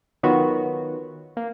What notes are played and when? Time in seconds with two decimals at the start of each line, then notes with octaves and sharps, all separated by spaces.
0.23 D#3 F#3 B3 F4 F#4
1.37 A#3